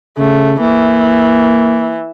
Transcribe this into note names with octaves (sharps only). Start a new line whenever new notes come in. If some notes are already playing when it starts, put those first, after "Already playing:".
C#3 A3
E3 A#3